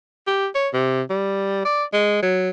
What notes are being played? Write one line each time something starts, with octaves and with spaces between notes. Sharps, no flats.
G4
C#5
C3
G3
D5
G#3
F#3